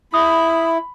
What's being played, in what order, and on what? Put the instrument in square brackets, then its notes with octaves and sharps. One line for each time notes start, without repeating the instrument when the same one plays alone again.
[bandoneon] E4 [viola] B5 [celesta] D#6